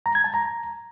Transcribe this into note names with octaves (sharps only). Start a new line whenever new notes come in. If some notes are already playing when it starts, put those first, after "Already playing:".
A#5
G#6
A5
A#5